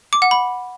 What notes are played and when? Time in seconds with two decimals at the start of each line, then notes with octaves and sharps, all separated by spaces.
0.13 D6
0.22 F#5
0.31 B5